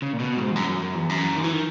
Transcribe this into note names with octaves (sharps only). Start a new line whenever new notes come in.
C#3
A#2
B2
G#2
E2
F#2
F#2
F#2
E2
F#2
D#3
E3
D#3